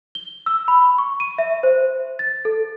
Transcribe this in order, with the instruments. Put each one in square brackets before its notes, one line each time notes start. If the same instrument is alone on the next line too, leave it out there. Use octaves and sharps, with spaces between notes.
[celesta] G7
E6
B5
C#6
D#7
E5
C5
A6
A4